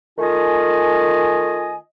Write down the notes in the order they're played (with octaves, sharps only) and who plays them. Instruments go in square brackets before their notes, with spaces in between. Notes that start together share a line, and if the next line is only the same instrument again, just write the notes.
[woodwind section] D#3 A3 F4 D#5 G#5